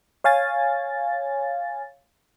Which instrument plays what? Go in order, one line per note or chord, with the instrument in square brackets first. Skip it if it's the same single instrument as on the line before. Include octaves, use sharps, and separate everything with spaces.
[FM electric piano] C#5 F5 G#5 A6